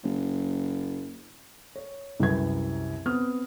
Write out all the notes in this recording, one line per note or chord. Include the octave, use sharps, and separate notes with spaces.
F#1
C#5
C2 F#2 B4 G#6
B3 C4 D#6 F6